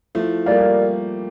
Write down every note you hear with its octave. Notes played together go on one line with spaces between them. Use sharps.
F3 A3 E4
G3 A#3 G4 A#4 D5 F5